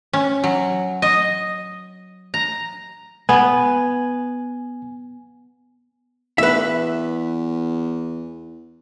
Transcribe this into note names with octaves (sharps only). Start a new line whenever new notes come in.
C#4
F#3
D#5
A#5
B3 G#5
E2 B4 E5